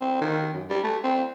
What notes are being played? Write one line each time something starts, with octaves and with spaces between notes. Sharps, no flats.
C4
D#3
F#2
G3
A3
C4